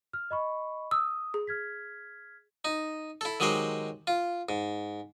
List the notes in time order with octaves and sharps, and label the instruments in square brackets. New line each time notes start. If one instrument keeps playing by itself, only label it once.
[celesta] F6
D#5 B5 C#6
[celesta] D#6 [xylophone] E6
[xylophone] G#4
[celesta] F6 G#6 B6
[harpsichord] D#4
E4 A4
D#3 F#3 G#3 G4 C5
F4
G#2